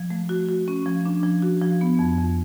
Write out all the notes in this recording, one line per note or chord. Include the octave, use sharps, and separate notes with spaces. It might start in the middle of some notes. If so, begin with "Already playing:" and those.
Already playing: F3
A3
F#4
F#4
C#4
F3
D4
F3
F#4
F3
B3
F2
F2